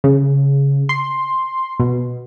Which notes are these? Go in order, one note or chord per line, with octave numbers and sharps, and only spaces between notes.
C#3
C6
B2